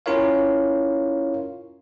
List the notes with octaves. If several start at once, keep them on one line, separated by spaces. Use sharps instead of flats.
C#4 E4 F4 A#4 C#5 F5